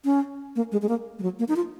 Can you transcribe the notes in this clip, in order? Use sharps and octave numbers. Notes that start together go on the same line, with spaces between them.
C#4
A#3
G#3
G#3
A#3
G#3
F#3
A#3
D#4
F4